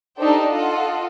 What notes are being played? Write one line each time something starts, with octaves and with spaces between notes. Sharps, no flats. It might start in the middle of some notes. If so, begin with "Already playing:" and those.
D4 D#4 G4 A4 C5 G5
F4 A4 D#5 F#5